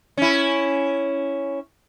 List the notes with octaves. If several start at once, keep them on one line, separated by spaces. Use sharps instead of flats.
C#4 E4